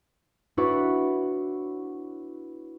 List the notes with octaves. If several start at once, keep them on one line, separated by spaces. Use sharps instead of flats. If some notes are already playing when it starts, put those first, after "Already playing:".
B3 D4 E4 F#4 B4 C#5